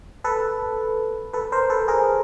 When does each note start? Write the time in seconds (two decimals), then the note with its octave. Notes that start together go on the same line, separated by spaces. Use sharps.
0.24 A4 B4
1.33 A4 B4
1.52 A#4 C5
1.70 A4 B4
1.88 G#4 A#4